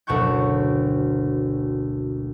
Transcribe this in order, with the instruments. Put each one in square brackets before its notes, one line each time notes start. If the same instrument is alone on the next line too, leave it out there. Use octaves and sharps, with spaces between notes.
[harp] F#1 D2 B2 A5 C#6 G6